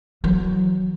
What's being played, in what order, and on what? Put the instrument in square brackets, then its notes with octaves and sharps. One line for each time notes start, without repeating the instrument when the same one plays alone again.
[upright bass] E3 F#3